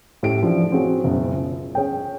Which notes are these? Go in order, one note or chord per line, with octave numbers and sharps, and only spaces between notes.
A2 C#4 G4 D7
C#3 E3 F3 D4 E4
C4 F#4 G#4 C#5
F#1 C#2 B2
F4
C#4 G#4 C#5 G5